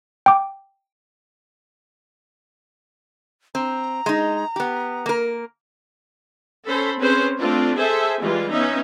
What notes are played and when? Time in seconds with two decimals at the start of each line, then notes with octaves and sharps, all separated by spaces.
0.26 G5 D6
3.55 C4 A#5
4.06 G#3 D#4
4.56 B3 G4
5.06 A#3 A#4
6.66 C#4 A4 C5 B5
6.99 C4 C#4 G#4 B4 C5
7.38 A3 C4 D4 F4
7.77 G#4 A4 C5 E5 G#5
8.21 E3 G3 G#3 F4
8.52 B3 C#4 D#4 E5